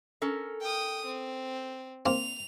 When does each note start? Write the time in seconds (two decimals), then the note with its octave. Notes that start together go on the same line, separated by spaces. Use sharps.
0.22 C#4 A4 A#4
0.61 G5 D#6
1.06 C4
2.06 A#3 C4 F7